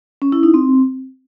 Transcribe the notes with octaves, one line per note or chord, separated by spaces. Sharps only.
C#4
E4
D#4
C4